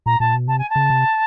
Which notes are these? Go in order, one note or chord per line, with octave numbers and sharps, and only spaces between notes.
A#2 A#5
A#2 A5
B2
C3 A5
G#5
A5
C#3
C3